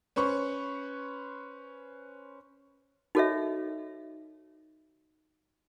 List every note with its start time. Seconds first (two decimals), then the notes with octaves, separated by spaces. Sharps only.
0.16 C#4 B4 C5 C#6
3.15 D#4 F#4 A4 C#5 D#5 E5